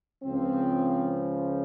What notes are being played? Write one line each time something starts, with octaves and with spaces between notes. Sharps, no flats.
C#2 C#3 F3 C4